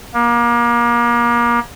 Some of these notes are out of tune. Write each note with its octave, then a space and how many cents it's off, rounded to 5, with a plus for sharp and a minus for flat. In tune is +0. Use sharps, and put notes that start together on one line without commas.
A#3 +30